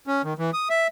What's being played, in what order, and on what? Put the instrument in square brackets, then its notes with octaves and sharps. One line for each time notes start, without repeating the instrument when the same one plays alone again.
[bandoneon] C#4
D#3
E3
D#6
E5